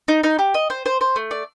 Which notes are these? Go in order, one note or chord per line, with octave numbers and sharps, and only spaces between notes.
D#4
D#4
G4
D#5
C5
C5
C5
A3
D5